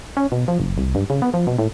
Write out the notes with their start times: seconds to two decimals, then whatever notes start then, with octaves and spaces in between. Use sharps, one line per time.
0.17 C#4
0.32 B2
0.48 F3
0.60 F#1
0.78 C2
0.95 G2
1.10 C#3
1.22 B3
1.34 F3
1.47 B2
1.59 A2